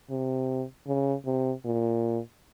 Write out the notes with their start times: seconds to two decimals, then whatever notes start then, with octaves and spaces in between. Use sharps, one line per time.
0.10 C3
0.87 C#3
1.26 C3
1.65 A#2